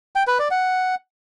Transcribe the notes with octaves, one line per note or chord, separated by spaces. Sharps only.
G5
B4
D5
F#5